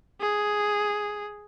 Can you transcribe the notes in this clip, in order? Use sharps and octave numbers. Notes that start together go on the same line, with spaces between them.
G#4